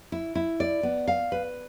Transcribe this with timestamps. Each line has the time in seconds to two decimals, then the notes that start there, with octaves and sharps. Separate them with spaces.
0.12 E4
0.35 E4
0.60 D5
0.83 B3
1.08 F5
1.32 B4